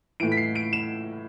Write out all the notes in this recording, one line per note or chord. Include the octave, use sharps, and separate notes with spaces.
A2 E3 D7
B6
C7
D7
E7